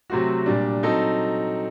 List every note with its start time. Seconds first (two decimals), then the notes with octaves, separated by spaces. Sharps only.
0.10 C3 F#3 A3 C4 F#4
0.46 A#2 G3 D4
0.83 F#3 C4 D#4 A4